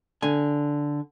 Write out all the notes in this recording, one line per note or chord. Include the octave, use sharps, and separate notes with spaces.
D3 G#5